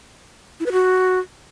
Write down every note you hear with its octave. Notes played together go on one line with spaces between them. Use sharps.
E4
B4
F#4